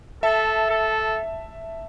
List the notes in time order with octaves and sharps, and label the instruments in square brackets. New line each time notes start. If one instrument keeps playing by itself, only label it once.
[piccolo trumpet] A4 [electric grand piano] E5 A5
[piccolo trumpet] A4